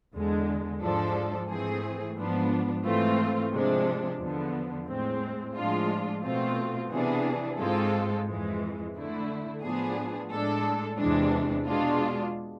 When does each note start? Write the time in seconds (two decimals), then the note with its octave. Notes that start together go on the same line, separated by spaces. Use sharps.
0.14 E2 D3 G#3
0.81 G#2 F3 G#3 D4 A4
1.49 G#2 E3 A3 C4 G#4
2.16 G#2 F3 B3 D4
2.85 G#2 E3 A3 C4 F4
3.53 C3 F3 G#3 D4
4.20 E2 D3 F3 B3
4.89 A2 G#3 C4
5.55 A2 F3 G#3 D4 F4
6.23 B2 A3 C4 F4
6.91 C3 E3 B3 D4 G#4
7.59 G#2 G#3 C4 F4 A4
8.27 F2 E3 G#3
8.95 D3 A3 E4
9.62 A2 F3 B3 D4 G#4
10.30 A2 G#3 D4 A4
10.98 E2 C3 E3 G#3 D4
11.66 B2 G#3 D4 F4